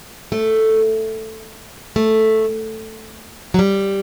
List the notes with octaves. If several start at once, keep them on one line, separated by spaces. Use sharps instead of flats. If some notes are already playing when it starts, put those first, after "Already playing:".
A3
A3
F#3
G3